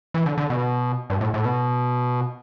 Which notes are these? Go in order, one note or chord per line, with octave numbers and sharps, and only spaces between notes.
E3
D3
D3
B2
G2
A2
A2
B2